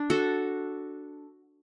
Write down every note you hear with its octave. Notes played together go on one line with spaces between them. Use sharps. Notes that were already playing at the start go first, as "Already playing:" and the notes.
Already playing: D4
F#4 A4